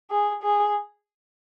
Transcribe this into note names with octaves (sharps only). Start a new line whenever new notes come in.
G#4
G#4